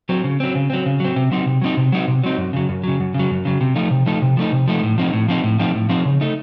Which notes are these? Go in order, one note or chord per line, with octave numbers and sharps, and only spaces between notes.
F#3 C4
C#3
F#3 C4
C#3
F#3 C4
C#3
F#3 C4
C3
F#3 C4 D#4
C3
F#3 C4 D#4
C3
F#3 C4 D#4
C3
F#3 C4 D#4
F#2
C#3 F#3
F#2
C#3 F#3
F#2
C#3
F#3
F#2
C#3 F#3
C3
F3 A3 D#4
C3
F3 A3 D#4
C3
F3 A3 D#4
C3
F3 A3 D#4
A2
F3 C4 D#4
A2
F3 C4 D#4
A2
F3 C4 D#4
A2
F3 C4 D#4
C#3
A3 D#4